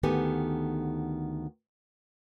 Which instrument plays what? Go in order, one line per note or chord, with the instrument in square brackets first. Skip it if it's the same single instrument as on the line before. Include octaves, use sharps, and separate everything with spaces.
[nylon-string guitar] D2 D#3 B3 G4 A4 G#5